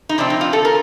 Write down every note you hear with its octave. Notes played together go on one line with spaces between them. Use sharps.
D#4
C3 F3 C4 D4
D#4
F4
A4
A#4